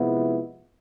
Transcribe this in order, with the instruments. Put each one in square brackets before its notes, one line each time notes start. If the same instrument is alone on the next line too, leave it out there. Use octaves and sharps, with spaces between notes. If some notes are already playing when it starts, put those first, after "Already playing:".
Already playing: [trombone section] C3 F3 G#3 B3 E4